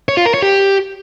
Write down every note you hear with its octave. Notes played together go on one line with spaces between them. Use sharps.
C#5
F4
A#4
C#5
G4